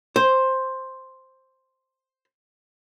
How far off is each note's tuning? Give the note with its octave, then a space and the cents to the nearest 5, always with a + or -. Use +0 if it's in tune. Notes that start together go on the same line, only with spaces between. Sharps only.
C5 +5